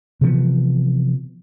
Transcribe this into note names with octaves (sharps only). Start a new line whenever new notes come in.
C3 E3 F3 B3